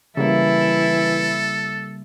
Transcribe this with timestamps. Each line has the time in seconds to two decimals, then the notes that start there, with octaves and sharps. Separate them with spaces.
0.17 C#3 E3 G3 A#3 E4 A4